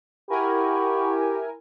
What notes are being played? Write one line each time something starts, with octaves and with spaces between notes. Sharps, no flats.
E4 G4 A#4 F#5 G#5 B5 C#6